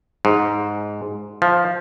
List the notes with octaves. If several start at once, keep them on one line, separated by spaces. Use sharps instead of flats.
G#2
F3